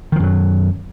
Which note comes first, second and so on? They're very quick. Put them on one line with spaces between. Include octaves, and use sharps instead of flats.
D#3 F3 F#2 F#3